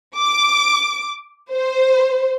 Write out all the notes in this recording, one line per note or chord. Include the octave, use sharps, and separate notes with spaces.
D6
C5